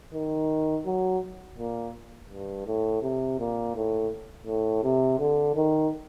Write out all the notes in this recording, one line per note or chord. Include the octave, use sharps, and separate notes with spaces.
D#3
F#3
A#2
G2
A2
C3
A#2
A2
A2
C3
D3
D#3